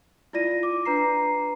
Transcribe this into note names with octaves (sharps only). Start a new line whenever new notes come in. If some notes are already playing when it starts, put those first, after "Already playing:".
E4 F4 D5 A#6 D#7
D6
D4 B4 A#5 C7